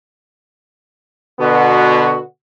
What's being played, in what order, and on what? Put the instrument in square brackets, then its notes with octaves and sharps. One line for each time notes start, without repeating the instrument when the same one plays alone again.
[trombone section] B2 D3 B3 F#4